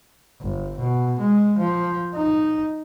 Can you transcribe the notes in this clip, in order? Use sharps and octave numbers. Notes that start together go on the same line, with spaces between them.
G1
B2
G#3
F3
D#4